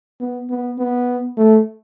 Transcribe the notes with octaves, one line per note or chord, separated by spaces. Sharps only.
B3
B3
B3
A3